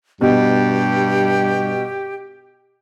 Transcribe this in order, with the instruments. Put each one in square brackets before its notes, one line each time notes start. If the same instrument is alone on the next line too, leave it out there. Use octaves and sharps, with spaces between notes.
[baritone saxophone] G2 [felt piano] B2 [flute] G4